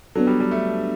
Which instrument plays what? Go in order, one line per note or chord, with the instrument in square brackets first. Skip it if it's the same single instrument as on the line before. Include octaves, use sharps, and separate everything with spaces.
[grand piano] F#3 [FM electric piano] B3 D4 A4
[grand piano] G3
G3
A3